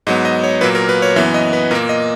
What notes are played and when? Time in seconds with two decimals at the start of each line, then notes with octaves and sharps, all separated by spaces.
0.07 G#2 F#3 B3 D#5
0.25 D#5
0.44 C#5
0.61 A#2 F#3 A#3 B4
0.75 A#4
0.89 B4
1.02 C#5
1.16 F#2 E3 B3 E5
1.34 D#5
1.53 B4
1.71 A#2 A#3 A#4
1.89 D#5